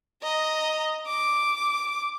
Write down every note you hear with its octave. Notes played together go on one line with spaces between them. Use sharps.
D#5 A#5
D6